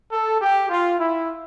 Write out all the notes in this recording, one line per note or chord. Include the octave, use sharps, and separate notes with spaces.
A4
G4
F4
E4